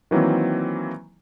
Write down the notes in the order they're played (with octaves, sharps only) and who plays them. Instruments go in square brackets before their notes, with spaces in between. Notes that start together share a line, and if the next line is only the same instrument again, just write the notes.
[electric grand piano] D#3 E3 F#3 A#3 C4